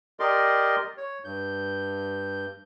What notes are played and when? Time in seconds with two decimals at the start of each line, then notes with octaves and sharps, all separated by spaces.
0.20 G4 A#4 D5 D#5 C6
0.98 C#5
1.25 G2 G6